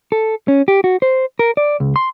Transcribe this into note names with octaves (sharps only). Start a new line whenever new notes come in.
A4
C#4
G4
F#4
C5
A#4
D5
C#2
C6